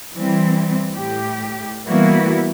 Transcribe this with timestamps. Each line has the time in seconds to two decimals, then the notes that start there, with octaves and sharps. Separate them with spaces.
0.15 E3 G3 C4
0.94 A2 G4
1.87 E3 G3 A#3 B3 E4 F#4